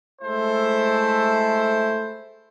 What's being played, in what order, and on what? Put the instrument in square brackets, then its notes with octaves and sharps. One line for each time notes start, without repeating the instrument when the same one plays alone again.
[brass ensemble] G#3 A3 E4 A4 C5